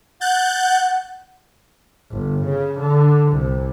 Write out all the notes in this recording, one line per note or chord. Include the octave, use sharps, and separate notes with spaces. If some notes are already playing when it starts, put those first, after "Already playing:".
F#5 F#6 G6 A6
G1
C#3
D3
C2